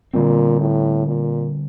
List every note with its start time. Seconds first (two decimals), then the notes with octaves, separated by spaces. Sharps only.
0.13 A#2 D3 G3 C4
0.60 A2
1.07 A#2